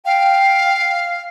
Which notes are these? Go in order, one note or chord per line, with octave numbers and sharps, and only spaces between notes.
F5 G5